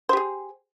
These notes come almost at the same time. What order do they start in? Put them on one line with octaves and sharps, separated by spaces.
C5 G4 G#4